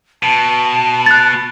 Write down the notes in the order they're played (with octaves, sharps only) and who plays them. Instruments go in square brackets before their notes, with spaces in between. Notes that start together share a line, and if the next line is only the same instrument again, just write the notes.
[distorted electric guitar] B2 [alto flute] A5
[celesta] F#6 A6